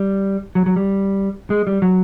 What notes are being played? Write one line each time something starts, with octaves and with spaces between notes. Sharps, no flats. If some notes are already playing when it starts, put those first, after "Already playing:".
Already playing: G3
F#3
F#3
G3
G#3
G3
F#3